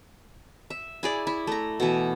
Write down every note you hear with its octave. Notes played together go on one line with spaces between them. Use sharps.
E5
E4 G#4 D5
E4
A3 A#5
B2 E3